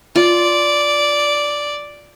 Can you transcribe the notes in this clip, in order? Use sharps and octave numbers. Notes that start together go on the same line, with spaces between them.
F4 D5